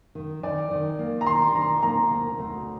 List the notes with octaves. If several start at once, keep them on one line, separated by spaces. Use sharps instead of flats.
D#3
D#3 D5
D#3
A#3
A#5
D#3 C6
D#3 A#5
A#3 A#5
D2
D2